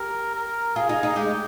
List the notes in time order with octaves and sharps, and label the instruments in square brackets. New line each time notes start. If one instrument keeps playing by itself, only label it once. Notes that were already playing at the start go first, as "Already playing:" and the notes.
Already playing: [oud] G4 [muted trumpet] A#4
[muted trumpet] A#4
[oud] F4 [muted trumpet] G#4
[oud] D#4
D#4
[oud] G#3 [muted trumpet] G4